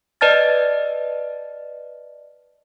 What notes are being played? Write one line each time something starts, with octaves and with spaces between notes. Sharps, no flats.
B4 D5 D#5 A5 F6 A6